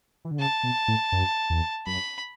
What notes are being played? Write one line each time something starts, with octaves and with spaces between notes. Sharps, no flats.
E3
D3
C#3 A5
B2
A2
F#2
E2
F#2 B5